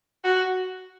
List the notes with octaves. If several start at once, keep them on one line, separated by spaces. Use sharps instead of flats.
F#4